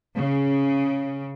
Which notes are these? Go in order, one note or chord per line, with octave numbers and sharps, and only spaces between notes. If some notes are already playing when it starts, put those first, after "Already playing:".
C#3